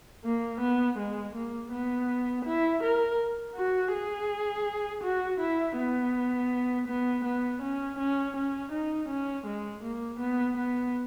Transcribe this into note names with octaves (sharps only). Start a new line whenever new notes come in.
A#3
B3
G#3
A#3
B3
E4
A#4
F#4
G#4
F#4
E4
B3
B3
B3
C#4
C#4
C#4
D#4
C#4
G#3
A#3
B3
B3